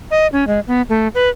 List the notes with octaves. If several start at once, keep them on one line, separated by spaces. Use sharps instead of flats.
D#5
C#4
G#3
B3
A3
B4